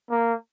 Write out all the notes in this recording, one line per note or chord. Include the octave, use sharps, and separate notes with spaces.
A#3